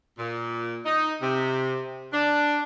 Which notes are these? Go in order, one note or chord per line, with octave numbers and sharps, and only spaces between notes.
A#2
D#4
C3
D4